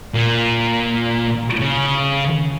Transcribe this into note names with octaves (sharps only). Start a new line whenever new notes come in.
A#2
C#3